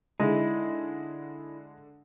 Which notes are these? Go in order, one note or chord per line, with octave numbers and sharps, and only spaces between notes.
D3 G#3 D#4 E4